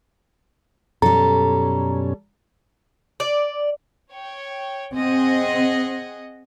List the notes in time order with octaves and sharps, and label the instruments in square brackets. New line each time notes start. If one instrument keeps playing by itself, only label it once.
[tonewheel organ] F#2 B2 C#4 [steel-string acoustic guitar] G3 A4 [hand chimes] A#5
[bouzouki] D5
[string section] C#5 G5
[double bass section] C4 [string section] G#4 D#5 F#5